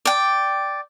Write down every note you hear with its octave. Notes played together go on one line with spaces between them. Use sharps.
D5 G5